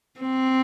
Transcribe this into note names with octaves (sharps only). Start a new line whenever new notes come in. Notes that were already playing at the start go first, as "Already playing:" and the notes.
C4